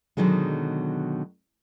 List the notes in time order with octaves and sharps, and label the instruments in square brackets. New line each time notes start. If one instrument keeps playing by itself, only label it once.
[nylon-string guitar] B2 D3 D#3 F#3 G#3